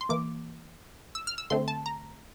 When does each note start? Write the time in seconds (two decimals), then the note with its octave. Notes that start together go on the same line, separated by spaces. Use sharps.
0.01 C6
0.09 E3 A#3 D6
1.15 E6
1.27 F6
1.38 E6
1.50 D3 A3 C4 C6
1.68 A5
1.86 A#5